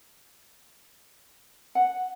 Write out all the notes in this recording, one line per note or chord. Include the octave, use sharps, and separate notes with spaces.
F#5